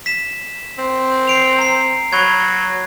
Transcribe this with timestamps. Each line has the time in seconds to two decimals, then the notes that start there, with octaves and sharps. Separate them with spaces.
0.06 B6 E7
0.78 C4
1.27 C7 D7 F7
1.59 A#5 C7
2.13 F#3 B5 C#6 G#6